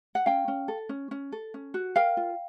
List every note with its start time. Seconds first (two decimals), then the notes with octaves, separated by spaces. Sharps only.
0.15 F#5
0.26 C#4 F5 G5
0.48 C#4
0.68 A4
0.89 C#4
1.11 C#4
1.32 A4
1.54 C#4
1.74 F#4
1.96 A#4 F5 G5
2.17 F4